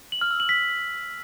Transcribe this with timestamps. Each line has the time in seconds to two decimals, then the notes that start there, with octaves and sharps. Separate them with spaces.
0.12 F#7
0.21 F6
0.31 E6
0.40 F#7
0.49 B6